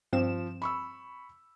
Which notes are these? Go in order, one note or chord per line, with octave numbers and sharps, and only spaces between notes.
G2 F3 C4 E7
B5 C#6 E6